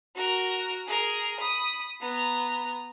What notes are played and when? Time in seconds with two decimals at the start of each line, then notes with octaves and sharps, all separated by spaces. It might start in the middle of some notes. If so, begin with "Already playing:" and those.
0.16 F#4 A#4
0.86 G#4 A#4
1.39 B5 D#6
2.01 B3 A#5